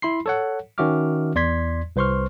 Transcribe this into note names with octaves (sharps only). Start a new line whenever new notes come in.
E4 B5 C6 C7
A4 C#5 F#5
D#3 C#4 F#4 E5 D6 F6
E2 D5 C6 G#6 B6
C2 B4 C5 C6 C#6 F6